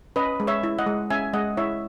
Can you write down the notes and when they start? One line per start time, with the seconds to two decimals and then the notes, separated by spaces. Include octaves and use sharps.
0.16 C#4 B4 D#5
0.40 G#3
0.47 C#5 E5
0.64 E4
0.79 D#5 F#5
0.87 G#3
1.10 C#4 E5 G#5
1.33 G#3 D#5 F#5
1.57 E4 C#5 E5